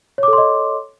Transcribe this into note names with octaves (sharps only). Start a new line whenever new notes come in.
A4 C#5 D#5 C6 D6